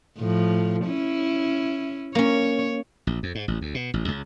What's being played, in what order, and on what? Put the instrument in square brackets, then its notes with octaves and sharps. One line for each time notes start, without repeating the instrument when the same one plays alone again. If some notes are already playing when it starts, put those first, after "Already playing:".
[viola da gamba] A2 F3
C#4 E4
[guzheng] A#3 C#4 [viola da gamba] C#5
[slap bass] A#1
F2
G#2
A1
D2
B2
A1
C#2